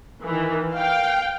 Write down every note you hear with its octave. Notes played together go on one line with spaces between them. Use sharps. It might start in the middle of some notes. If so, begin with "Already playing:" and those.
D#3 E3
F5 G5